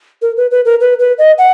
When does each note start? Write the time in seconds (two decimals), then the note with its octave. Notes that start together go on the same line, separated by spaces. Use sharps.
0.22 A#4
0.37 B4
0.51 B4
0.65 A#4
0.81 B4
0.99 B4
1.18 D#5
1.38 F#5